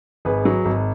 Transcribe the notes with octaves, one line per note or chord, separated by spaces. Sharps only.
G#1 G#4 B4
F#3
G#1